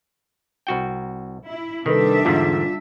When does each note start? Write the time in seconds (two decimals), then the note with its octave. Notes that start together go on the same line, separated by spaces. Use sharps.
0.67 C2 F#4 G5
1.47 E4
1.86 C3 D#3 G3 D4 A4 B4 E5
2.25 E2 G#2 D3 F4